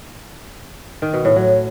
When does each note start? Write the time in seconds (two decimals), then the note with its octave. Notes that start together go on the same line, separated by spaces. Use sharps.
1.02 D#3
1.13 B2
1.25 A2
1.36 F#3